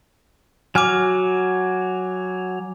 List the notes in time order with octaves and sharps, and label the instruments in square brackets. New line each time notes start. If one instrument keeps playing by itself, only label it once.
[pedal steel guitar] F#3 F6 [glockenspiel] G#5 D6